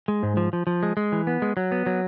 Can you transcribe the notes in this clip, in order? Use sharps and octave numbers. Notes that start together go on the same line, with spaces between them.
G#3
G#2
F3
F3
F3
G#3
G#3
E3
B3
G#3
F#3
B3
F#3